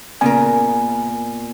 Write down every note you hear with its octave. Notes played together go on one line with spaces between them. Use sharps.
A#2 C#3 B3 A#4 G#5